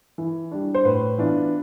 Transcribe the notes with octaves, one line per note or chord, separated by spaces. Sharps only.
E3
G3 D4
C5
A2 B4
E3 B3 D4 F4